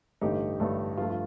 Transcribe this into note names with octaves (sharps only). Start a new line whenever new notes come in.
A1 G2 D3 A3 D#4 G4
A1 G2 D3 A3
G2 F3 A3 F4
F4